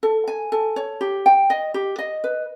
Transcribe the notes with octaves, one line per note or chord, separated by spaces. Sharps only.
A4
G#5
A4
C#5
G4
G5
D#5
G4
D#5
B4